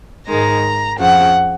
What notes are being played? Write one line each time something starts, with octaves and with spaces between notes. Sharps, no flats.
G#2 D#3 G#3 A#5
F2 C#3 F3 F#5